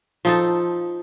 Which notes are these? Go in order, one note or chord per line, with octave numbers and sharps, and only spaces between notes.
F3 D#4 A4